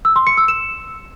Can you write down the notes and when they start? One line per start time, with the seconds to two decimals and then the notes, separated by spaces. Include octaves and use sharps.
0.05 E6
0.16 C6
0.27 C#7
0.37 E6
0.48 E7